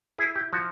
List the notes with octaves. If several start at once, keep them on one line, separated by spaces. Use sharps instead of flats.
E4 G#4
G4
F3 F#4